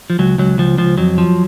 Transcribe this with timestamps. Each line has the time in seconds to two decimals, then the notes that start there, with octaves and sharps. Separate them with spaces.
0.10 F3
0.19 C#2 F#3
0.38 C#2 F#3
0.58 C#2 F3
0.78 C#2 F3
0.98 F2 F#3
1.18 F3